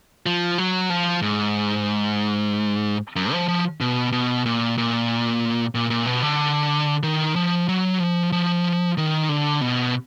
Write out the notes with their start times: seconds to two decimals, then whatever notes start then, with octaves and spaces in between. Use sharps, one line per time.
0.26 F3
0.58 F#3
0.90 F3
1.22 G#2
3.16 F#2
3.32 F3
3.48 F3
3.81 B2
4.12 B2
4.46 A#2
4.78 A#2
5.75 A#2
5.90 A#2
6.06 B2
6.22 D3
7.03 D#3
7.36 F3
7.69 F#3
8.00 F3
8.32 F3
8.98 D#3
9.29 D3
9.61 B2